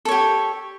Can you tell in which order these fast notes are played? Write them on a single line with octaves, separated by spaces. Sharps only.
A4 C#5 G4